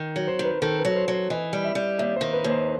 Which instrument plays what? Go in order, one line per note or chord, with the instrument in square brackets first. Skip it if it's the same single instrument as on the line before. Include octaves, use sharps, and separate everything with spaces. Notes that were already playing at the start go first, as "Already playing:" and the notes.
Already playing: [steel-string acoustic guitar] D#3
F#3
[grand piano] C5
[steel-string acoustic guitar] D#3
[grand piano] B4
[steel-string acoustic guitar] D#3 [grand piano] A4
[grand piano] B4
[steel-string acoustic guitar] F#3
[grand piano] C5
[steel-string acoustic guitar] F#3
[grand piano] C5
[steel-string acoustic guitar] E3 [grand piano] D#5
[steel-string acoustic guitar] G3
[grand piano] E5
[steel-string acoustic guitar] G3
[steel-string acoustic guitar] D#2 [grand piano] E5
[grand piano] C5
[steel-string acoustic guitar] D#3
[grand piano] B4
[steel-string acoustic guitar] D#2
[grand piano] C5